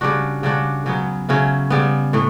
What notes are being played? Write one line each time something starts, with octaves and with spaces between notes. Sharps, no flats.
C#3 G3 D4 F#4
C#3 G3 D4 F#4
C#3 F#3 B3
C#3 F#3 C#4 E4
C#3 G3 B3
A2 E3 A3